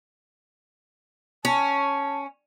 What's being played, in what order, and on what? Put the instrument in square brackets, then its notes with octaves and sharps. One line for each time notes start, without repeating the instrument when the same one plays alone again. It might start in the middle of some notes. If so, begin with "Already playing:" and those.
[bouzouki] C#4 [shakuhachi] A5